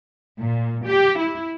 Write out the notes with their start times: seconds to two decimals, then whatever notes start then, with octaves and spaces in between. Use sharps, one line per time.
0.41 A#2
0.89 G4
1.19 E4